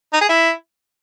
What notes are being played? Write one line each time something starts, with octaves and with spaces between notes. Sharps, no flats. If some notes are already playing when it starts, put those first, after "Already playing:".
D#4
G#4
E4